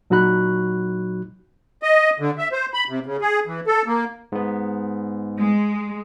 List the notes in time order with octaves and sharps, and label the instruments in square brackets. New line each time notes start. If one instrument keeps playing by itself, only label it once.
[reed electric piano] A#2 F#3 D#4 F#4 B5 F#6
[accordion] D#5
D3
E5
C5
B5
C3
C#3
G#4
E3
A4
A#3
[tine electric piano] G#2 B3
[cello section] G#3